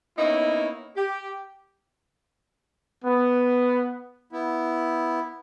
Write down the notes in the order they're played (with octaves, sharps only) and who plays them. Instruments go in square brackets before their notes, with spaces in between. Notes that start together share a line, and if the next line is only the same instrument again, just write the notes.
[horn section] A#3 B3 C#4 D#4 E4 C#5
G4
[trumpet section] B3
[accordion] B3 E4